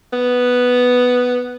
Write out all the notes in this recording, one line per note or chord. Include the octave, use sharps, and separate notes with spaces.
B3